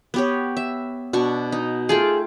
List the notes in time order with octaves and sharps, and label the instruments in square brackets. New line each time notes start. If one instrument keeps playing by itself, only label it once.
[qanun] B3 G4 C#5
E5
B2 D4 C#6
D#4
[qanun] A3 F4 G5 [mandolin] G#4